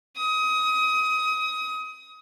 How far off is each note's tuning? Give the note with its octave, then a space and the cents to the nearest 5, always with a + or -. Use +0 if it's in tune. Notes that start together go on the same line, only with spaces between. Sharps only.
D#6 +25